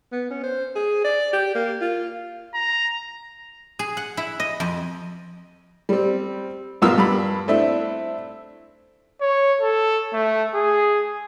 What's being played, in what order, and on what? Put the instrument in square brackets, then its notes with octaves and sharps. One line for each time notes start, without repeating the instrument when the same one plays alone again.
[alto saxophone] B3
C#4
C5
G#4
D5
G4
A#3
F4
[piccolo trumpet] A#5
[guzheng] G#4
F#5
E4
D#5
F2
[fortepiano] G3 C4
A#1 G2 B3 F4 A#4 E6
G2 B5
A3 C4 D4 E4
[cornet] C#5
A4
A3
G#4